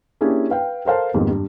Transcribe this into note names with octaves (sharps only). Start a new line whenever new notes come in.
A#3 C#4 D4 E4 G4 G#4
B4 F5 G5
A4 A#4 C5 F5 A5
F2 G#2 D#3 G3 A#3 B3
G2